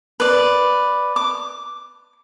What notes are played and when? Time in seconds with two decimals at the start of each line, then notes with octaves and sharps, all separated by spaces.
0.20 B4 D5
1.16 D6